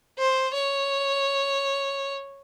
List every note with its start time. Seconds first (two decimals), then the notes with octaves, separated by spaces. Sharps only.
0.18 C5
0.53 C#5